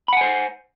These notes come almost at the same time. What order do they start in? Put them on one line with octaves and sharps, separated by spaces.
B5 F#5 G#5 C5